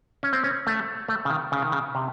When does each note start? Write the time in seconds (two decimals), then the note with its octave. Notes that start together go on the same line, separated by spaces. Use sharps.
0.23 C#4
0.33 C4
0.44 C#4
0.67 A3
1.08 A3
1.25 C#3
1.30 D#3
1.52 C#3
1.62 D#3
1.72 C#3
1.95 C3